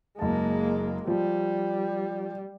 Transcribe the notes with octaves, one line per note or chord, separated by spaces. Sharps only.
F#1 G#3 A#3 A5
F3 G3